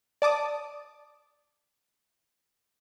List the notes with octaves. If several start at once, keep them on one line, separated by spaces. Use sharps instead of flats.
D5 A5 D6 D#6